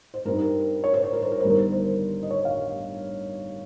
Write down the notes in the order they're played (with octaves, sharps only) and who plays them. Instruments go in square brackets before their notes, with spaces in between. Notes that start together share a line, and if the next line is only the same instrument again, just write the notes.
[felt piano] C5
G2 G3 C4 D#4 A#4
C#5
C5
C#5
A#4
C5
A#4
G1 G2 D#3 C5
A#4
C5
D#5
C#5
F5